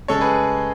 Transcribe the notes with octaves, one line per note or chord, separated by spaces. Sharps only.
C#3 G#3 A4 C#5
G#4 B4